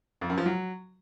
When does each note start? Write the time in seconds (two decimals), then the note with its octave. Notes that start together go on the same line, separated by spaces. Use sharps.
0.21 F2
0.30 F#2
0.38 F3
0.46 F#3